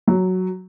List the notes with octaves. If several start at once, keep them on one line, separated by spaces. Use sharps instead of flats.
F#3